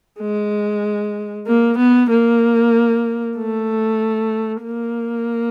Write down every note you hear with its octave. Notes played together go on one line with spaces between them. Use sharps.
G#3
A#3
B3
A#3
A3
A#3